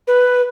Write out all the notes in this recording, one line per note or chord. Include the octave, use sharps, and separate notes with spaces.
B4